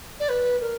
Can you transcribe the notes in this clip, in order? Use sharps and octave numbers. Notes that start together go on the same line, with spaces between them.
D5
B4
A#4